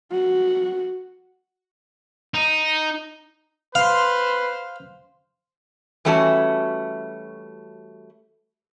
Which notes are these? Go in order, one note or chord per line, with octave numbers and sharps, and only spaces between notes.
F#4
D#4
B4 C5 F5 C6
E3 G3 A3 C#4 F#4 A5